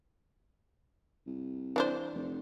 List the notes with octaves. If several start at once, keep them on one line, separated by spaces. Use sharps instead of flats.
C2
E3 D4 C5
F1